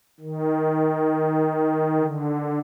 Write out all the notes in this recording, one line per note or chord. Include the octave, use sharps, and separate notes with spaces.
D#3
D3